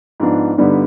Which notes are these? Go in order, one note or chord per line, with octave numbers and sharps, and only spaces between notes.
G#2 F3 B3 D4
G2 D3 G3 B3 D#4